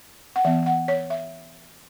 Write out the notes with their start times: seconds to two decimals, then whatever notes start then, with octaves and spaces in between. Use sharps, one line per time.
0.36 F#5
0.45 E3 B3 E5
0.66 F#5
0.88 C#5
1.10 E5